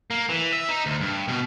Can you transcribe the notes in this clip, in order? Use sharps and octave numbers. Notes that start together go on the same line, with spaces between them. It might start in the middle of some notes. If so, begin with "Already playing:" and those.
A#3
E3
E5
D#4
D2
G2
B2